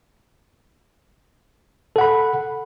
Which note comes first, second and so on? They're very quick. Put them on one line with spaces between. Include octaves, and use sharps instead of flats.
A4 F#5 B5